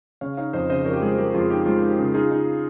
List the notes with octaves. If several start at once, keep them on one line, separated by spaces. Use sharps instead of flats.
C#3 C#5 F5
D#4 C#5 F5
F2 C5 D#5
C#3 C5 D#5
F2 A#4 C#5
G4
G#3 F4 G#4
G#3 G4 A#4
F2 F4 G#4
D#4 G4
G#3 F4
D#4
G4
C#3
D#4 F4 G#4
D#4